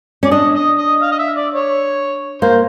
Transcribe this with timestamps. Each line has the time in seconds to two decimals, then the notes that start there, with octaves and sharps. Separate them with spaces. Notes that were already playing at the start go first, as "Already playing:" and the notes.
0.23 C#4 D5
0.31 D4 D#5
0.55 D#5
0.78 D#5
1.02 F5
1.12 D#5
1.19 E5
1.37 D5
1.54 C#5
2.42 A#3 C5